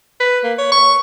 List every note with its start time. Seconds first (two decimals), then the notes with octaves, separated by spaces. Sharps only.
0.20 B4
0.44 A#3
0.58 C#5
0.72 C#6